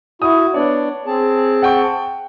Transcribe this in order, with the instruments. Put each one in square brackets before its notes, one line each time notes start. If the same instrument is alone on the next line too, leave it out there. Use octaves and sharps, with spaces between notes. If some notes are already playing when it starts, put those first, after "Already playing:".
[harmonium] E4 F#4 [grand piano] D#6
[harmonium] B3 D4 D5 [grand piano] C#5
[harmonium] C4 G#4 A5
[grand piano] F#5 G5 C#6